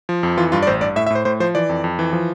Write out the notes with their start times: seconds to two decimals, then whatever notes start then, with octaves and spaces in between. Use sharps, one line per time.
0.09 F3
0.23 F2
0.37 E3 F4
0.52 G2 F4
0.63 D5
0.67 A1 C5
0.81 G2 D5
0.96 A2 E5
1.07 E5
1.10 A2 C5
1.25 A2 C5
1.40 F3 C5
1.55 E3 D5
1.69 F2
1.84 F2
1.99 E3
2.13 F3